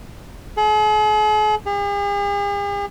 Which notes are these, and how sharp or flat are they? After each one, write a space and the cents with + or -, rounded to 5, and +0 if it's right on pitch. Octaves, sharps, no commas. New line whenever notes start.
G#4 +45
G#4 -45